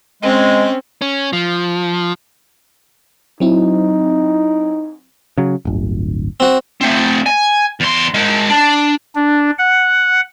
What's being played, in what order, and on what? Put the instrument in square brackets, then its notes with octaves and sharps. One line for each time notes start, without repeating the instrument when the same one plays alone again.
[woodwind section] G#3 [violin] C4 C#4
[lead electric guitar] C#4
F3
[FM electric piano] F#3 C4 E4 [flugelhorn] D#4
[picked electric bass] C#3 F#3
D1 G1
[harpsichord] C4 F#4
[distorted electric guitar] A3 C4
G#5
E2 C6
G#3 A#4
D4
[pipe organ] D4
F#5